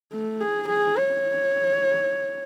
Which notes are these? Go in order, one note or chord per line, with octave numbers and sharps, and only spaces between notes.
A3
G#4
G#4
C#5